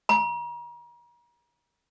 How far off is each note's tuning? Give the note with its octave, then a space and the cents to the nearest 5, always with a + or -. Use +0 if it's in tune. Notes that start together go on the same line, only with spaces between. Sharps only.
A#5 +40